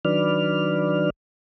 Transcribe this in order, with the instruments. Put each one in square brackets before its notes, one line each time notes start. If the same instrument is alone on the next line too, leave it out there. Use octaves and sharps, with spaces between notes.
[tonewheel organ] D#3 F#3 D4 B4 D5 F6